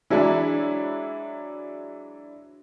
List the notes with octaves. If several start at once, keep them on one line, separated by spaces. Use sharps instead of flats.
E3 F#3 G#3 D4 E4